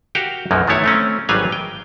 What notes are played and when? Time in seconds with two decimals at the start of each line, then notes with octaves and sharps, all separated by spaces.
0.15 F#4 G4 A#4 F5 G5
0.51 B1 F#2 F3 F#3 A#3
0.67 D#3 A3 B3 E4 C#5
0.84 A3 C4 C#4
1.29 G#1 F#3 G3 B4 F5 G#5
1.52 G5